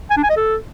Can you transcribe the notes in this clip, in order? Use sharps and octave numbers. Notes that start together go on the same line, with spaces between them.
G#5
D4
G#5
D#5
A4